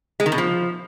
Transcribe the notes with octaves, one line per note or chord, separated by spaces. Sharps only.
G#3
D#3
B2
F3